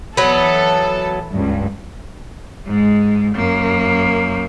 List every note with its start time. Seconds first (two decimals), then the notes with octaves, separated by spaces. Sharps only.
0.17 E3 F#3 B3 A4
1.33 C#2 G2
2.67 G#2 G#3
3.36 F#2 A#3